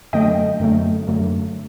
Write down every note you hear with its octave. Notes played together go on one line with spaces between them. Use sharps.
F#2 D3 F#3 A3 D#5 G5
F#2 D3 F#3 A3
F#2 D3 F#3 A3